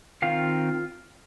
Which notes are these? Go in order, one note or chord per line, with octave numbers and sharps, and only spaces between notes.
D#3 C4 F4 F5